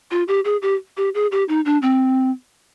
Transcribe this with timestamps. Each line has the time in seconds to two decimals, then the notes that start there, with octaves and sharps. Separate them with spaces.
0.11 F4
0.28 G4
0.45 G#4
0.62 G4
0.97 G4
1.15 G#4
1.32 G4
1.48 D#4
1.65 D4
1.82 C4